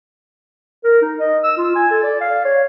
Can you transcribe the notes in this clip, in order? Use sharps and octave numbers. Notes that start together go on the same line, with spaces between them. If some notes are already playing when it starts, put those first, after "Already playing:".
A#4
D#4
D#5
E6
F4
G#5
A4
D5
F5
C#5